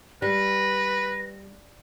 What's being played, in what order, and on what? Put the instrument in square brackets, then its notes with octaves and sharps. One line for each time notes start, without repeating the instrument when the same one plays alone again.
[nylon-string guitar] G3 [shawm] B4 [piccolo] A#6